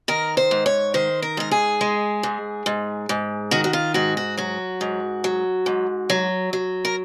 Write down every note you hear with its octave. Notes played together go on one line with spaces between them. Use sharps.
D#3 A#4
C5
G#2
C#5
D#3 C5
A#4
G#2 A#4
G#4
G#3
G#2
G#2
G#2
D#3 F#4
F#4
F4
G#2 F#4
F#4
F#3 F#4
G#2
F#3
G#2
F#3
F#3
A#4